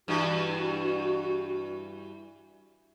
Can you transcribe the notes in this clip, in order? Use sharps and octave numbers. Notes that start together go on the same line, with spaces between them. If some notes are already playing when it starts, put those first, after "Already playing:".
G2 E3 F#4